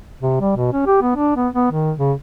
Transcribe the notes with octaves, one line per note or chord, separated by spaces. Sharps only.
C3
G3
B2
C#4
G4
B3
D4
B3
B3
D#3
C#3